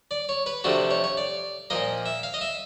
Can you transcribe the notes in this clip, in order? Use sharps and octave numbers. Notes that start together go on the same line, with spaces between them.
D5
C#5
B4
C3 F3 A3 D4 F#4
C#5
C#5
D5
A#2 F3 A#3 D#5
E5
F5
D#5
E5